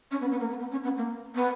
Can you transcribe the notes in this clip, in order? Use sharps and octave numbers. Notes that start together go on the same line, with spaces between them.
C#4
B3
B3
A#3
B3
B3
C#4
B3
A#3
B3